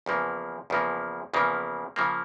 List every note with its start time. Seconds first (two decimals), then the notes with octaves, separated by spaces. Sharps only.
0.06 E2 C#3 F3 A#3
0.70 E2 C#3 F3 A#3
1.34 E2 C#3 F3 A#3
1.96 C#3 F3 A#3